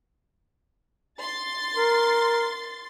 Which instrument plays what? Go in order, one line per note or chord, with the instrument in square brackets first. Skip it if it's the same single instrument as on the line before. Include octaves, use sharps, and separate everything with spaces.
[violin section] C6 A6
[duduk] A#4